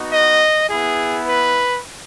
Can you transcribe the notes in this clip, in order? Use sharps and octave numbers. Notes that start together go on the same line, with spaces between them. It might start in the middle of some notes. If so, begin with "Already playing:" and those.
Already playing: B3 D#4 F#4
D#5
B3 E4 G#4
B4